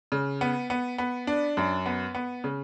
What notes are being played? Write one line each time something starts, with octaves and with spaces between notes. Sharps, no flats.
C#3
B3
B3
B3
D4
F#2
B3
B3
C#3